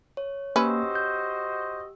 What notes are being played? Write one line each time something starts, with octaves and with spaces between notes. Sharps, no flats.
C#5
A#3 C#4 F#4 G4 B4 C5 D#5 E6
G6